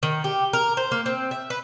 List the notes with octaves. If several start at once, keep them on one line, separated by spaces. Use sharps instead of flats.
D#3
G4
A#4
C5
A#3
C4
E5
B4